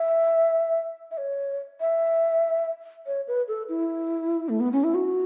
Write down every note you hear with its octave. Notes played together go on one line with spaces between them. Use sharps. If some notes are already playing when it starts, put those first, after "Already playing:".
Already playing: E5
E5
C#5
E5
C#5
B4
A4
E4
A3
B3
C#4
E4
F#4